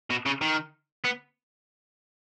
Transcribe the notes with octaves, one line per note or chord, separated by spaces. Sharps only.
B2
C#3
D#3
B3